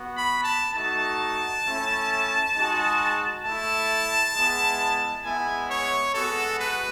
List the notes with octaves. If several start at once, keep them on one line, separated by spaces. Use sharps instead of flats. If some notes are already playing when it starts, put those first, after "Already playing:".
Already playing: B3 F#4
B5
A5
A3 D#4 F#4 A5
A3 C#4 E4
G#3 D#4 F#4
A3 A5
E4
G#3 B3 E4
G#3 B3 E4 G#5
C#5
G#3 B3 F#4 A4
B4